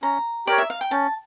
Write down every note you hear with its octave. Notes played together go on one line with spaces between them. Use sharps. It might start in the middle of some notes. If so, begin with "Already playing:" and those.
C#4 A#5
G4 A#4 C#5 D5
E5
F5
G5
C#4 A5